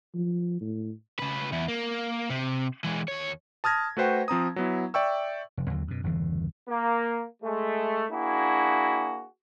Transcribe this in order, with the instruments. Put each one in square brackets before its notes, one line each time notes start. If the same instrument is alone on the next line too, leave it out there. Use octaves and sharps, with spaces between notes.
[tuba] F3
A2
[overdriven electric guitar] C#3 B4
E2 E4
A#3
C3
E3 G#3
D#2 C#5
[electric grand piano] A5 D#6 F6 G#6 A#6
A3 F#4 B4 C5 F#5 G5
F3 C4 A#5 D#6
F#3 B3 E4
D5 E5 G5 C#6 E6
[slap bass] F1
D#2 D3 F#3
F#2 B2
G1 E2 C#3 E3
[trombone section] A#3
G#3 A3
A#3 D4 E4 F#4 G#4